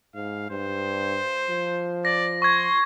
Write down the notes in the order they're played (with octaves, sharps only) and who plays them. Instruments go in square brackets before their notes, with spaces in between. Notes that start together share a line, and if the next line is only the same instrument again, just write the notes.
[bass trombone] G#2 [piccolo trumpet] F5
[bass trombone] G2 [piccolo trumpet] C5
[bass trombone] F3
[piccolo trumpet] D5 [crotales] A#6
[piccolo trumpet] C6 [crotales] C#6 G#6